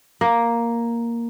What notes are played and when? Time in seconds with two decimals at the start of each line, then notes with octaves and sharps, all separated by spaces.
0.21 A#3